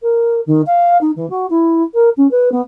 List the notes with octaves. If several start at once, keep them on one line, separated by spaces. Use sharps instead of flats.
A#4
D#3
F5
D#4
E3
F#4
E4
A#4
C#4
B4
B3